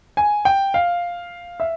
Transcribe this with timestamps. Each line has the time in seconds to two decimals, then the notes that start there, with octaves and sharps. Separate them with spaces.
0.17 G#5
0.45 G5
0.74 F5
1.60 E5